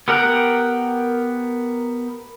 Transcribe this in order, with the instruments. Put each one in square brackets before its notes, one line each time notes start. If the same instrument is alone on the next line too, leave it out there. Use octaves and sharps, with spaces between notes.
[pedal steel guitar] B3 G4 A#4 F#5 G5